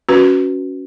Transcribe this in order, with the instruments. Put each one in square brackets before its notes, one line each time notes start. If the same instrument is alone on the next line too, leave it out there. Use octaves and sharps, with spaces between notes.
[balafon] C#4 F#4 B4